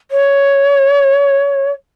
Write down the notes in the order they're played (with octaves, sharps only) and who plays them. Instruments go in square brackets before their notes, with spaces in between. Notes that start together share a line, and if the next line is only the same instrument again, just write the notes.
[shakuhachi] C#5